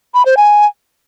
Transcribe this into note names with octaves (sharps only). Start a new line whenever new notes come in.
B5
C5
G#5